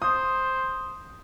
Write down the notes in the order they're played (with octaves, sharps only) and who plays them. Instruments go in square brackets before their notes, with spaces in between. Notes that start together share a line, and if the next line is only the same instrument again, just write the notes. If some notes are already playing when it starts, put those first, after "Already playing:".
[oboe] C5 [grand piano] D#6